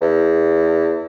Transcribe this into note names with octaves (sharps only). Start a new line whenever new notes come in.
E2